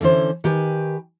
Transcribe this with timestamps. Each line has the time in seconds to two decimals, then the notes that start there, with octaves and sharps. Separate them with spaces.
0.01 D3 E3 C#4 C5
0.44 D#3 G4 B4 G#5